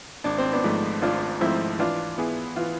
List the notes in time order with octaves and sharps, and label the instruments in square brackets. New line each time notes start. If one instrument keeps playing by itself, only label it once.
[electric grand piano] G#1 [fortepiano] D4
[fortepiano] C4
B3 D4
[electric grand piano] G#2 F3 A3
[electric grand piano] G#1 [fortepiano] D4 F4
[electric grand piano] G#2 F3 A3 [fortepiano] C4 E4
[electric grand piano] E3 [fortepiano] D4 F4
[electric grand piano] B3 E4 G#4
[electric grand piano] E3 [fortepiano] F4